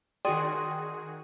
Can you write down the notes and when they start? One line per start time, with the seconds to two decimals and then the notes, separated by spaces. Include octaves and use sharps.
0.25 D#3 F#4 G#4 D5 G5 C6 D#6 D#7